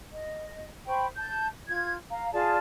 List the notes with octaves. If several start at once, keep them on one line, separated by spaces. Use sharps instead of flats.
D#5
C5 G5 B5 C#6
A5 G6
F4 G#6
F5 A#5
F4 G#4 D5 A5